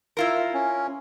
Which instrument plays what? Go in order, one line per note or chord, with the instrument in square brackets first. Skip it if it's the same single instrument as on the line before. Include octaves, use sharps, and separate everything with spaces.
[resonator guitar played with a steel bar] E4 F4 A#4
[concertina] C#4